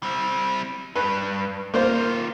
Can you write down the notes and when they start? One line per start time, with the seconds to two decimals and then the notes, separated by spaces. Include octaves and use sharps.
0.03 G3 C4
0.96 G2 B4
1.74 D#3 A#3 F4 C5